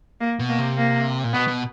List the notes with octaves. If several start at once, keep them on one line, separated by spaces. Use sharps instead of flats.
A#3
B2
A#3
C3
A#3
A#2
B2 B3
B2